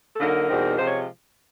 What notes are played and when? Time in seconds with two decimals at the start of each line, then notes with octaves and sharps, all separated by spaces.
0.13 A4
0.20 D3 F#3 A#3 D#4 A#4
0.49 E2 B2 G3 C4 D#4
0.77 C3 F3 G#3 C5
0.86 C#5